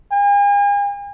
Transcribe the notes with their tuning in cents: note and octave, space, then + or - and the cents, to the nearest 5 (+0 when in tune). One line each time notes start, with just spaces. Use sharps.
G#5 -45